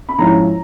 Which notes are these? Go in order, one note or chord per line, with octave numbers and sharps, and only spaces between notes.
B5
G#2 F3 G#3 C#4 E4 A#5